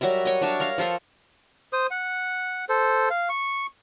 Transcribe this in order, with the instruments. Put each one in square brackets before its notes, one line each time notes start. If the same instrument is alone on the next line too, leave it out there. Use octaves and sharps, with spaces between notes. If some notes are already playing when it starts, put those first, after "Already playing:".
[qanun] F#3 G3 A#4 E5
C#5 D#5
D4 C#5 E5 A5
A#4 F5 C#6
F3 F4 A4 A#4
[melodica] C5 D#6
F#5
A4 C5
F5
C#6